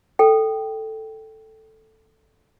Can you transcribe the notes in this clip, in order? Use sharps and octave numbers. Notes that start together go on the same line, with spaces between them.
A4 G5